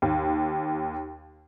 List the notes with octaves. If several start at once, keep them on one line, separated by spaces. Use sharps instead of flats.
D#2